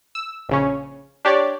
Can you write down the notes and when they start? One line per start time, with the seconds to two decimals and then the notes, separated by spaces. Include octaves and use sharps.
0.15 E6
0.49 A#1 C#3 C#4
1.25 D4 G4 C#5 D5